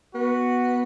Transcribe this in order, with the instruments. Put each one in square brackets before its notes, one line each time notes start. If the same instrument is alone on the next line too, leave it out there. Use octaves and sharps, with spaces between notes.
[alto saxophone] B3 [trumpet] F#4